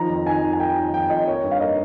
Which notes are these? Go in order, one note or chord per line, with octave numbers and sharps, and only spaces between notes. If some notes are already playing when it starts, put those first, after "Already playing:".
Already playing: D#3 F3 A#5
F2
D#3 G#5
D#3
G#5
A#3 G5
D#3
F2 G5
F2 D#5
A#3 C#5
G2
F5
A#3 D#5